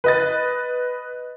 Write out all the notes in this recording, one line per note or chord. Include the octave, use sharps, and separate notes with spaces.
B4 D#5 A6